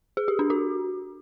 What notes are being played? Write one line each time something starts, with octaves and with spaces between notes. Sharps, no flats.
G#4
G4
D4
F#4